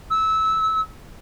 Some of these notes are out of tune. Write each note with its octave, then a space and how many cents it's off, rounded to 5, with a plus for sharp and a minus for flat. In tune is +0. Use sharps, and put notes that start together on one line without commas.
E6 -20